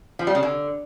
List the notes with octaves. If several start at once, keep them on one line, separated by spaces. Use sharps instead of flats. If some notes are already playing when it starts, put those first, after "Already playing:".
F3
G3
C#3
D3